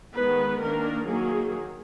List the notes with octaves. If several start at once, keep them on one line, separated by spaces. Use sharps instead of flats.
D#3 G#3 B3 B4
D#3 A#3 D4 A#4
D#3 F#3 A#3 G#4